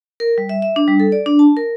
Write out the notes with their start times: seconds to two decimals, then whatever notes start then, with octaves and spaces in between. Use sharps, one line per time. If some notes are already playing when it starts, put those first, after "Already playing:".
0.20 A#4
0.38 G3
0.49 E5
0.62 E5
0.76 D4
0.88 G3
1.00 A4
1.12 D5
1.26 D4
1.39 A5
1.57 A#4